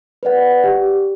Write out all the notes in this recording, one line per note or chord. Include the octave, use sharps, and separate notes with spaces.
B4 D5 F#5
G4